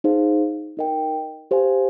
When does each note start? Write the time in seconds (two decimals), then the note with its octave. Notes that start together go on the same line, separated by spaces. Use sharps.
0.04 D#4 G#4 C5 F5
0.77 D#4 A#4 D#5 G5
1.51 G4 C5 F5 G#5